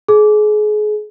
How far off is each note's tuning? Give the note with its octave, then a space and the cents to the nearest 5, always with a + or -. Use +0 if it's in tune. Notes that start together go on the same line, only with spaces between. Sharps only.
G#4 +30